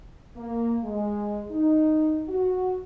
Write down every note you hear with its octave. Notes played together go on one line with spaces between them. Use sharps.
A#3
G#3
D#4
F#4